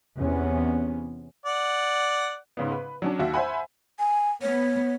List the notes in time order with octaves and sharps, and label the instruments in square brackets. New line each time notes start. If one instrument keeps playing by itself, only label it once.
[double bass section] E2 C3 B3 C#4
[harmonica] D5 F#5
[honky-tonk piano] G#2 C#3 B3
B4
F#3 C#4 D4
D#2 F#4 E5
C5 E5 F#5 G#5 B5
[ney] G#5
[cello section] B3 [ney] C#5